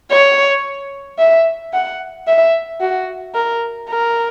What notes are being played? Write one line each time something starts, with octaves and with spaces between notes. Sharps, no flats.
C#5
E5
F#5
E5
F#4
A#4
A#4